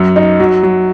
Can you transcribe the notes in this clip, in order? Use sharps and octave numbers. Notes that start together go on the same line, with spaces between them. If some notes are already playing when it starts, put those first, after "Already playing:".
Already playing: F#2
D#4
F#3
F#3